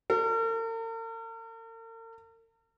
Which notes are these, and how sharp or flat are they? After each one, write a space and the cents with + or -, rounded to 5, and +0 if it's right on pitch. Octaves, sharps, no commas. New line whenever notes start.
A#4 -45